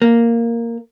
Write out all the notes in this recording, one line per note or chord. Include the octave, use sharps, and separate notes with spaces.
A#3